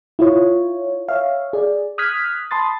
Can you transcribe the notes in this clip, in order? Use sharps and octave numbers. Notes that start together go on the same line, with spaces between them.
E4 F4 C#5
C#5 E5 F5
G#4 D5
D#6 F6 F#6 G#6 B6
A5 B5 C6 D#6 A6